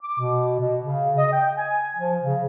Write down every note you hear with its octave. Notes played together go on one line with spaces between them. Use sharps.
D6
B2
B2
C#3
D#5
G5
G#5
F3
C#3